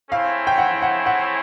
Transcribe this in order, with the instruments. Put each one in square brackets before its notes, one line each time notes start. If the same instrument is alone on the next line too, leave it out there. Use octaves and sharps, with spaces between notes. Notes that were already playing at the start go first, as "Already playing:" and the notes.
[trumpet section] A3 C4 E4 G#4 C#5 [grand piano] F5
[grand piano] G5
F#5
F#5
F#5